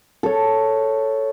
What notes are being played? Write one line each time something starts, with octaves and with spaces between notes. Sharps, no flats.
A4 C#5